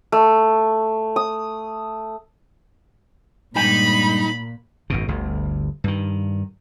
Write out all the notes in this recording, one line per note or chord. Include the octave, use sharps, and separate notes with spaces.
A3
D#6
G2 A#2 G#3 D#4 G5 B5
G#1 F#2 B2
G1 D2
G2 D#3